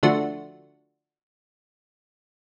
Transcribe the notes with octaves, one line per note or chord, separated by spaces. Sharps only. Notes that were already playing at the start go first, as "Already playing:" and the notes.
D3 F3 A3 D4 F#4